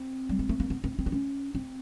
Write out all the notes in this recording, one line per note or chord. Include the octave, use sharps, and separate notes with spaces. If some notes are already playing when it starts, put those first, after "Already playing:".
Already playing: C4
G3
G#3
A3
A#3
B3
C4
C4
D4
C#4
C4